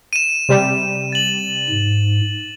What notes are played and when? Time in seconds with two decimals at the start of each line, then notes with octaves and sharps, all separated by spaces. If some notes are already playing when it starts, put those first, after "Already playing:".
0.13 D#7 E7
0.49 C3 G3
1.12 A6 F#7
1.69 G#2